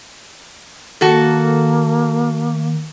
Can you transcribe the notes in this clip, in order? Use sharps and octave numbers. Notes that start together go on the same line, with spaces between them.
D#3 A#3 F#4 A4